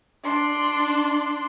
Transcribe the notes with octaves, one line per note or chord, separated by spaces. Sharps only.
D4 C6